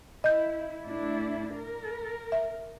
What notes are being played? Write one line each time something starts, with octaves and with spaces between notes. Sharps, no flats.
E4 D#5 G6
A2 D4 E4
A#4
E5